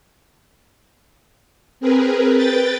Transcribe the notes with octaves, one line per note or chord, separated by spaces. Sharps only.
C4 G#4 A#4 B4
B4 G5 A6